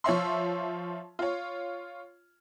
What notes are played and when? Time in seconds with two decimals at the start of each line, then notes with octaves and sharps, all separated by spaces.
0.04 F3 C#5 E5 C6
1.19 F4 C#5